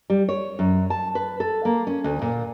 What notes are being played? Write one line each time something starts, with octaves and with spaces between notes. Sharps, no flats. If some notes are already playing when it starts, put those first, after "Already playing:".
G3
C#5
F#2
A5
B4
A4
A#3
C#4
D2
A#2